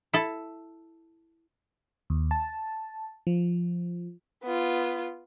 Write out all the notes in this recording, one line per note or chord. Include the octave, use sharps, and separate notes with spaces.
E4 A4
D#2
A5
F3
B3 F4